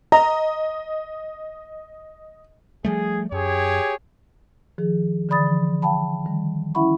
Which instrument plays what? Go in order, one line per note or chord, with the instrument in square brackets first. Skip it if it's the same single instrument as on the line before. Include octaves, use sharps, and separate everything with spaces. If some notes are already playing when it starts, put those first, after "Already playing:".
[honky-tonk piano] D#5 [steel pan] A#5
[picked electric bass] F3 G3 A3 [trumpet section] G#4
[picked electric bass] F#2 [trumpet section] G4 G#4 C#5
[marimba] D#3 F3 G#4
D3 E3 D5 B5 D#6 A6
F3
F5 G5 A5 B5
D#3 G3
C#4 E4 E5 F#5 B5 C#6